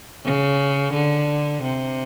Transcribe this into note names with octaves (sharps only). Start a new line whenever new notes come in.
C#3
D3
C3